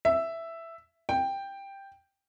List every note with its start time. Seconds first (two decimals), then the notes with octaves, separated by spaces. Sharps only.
0.05 E5
1.09 G5